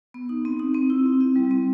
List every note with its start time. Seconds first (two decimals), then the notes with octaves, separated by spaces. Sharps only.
0.14 B3
0.29 D#4
0.45 C4
0.59 D#4
0.74 C4
0.90 E4
1.06 C4
1.20 E4
1.36 G3
1.51 C4